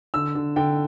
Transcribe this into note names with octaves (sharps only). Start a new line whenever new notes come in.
D3 E6
D3
D3 G5